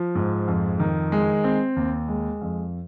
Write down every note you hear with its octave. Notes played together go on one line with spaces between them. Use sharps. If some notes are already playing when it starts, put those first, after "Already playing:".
Already playing: F3
G#2
F2
D#3
G#3
C4
D#2
G#3
F2